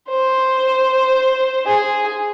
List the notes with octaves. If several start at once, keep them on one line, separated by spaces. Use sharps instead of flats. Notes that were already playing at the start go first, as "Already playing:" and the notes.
C5
G#4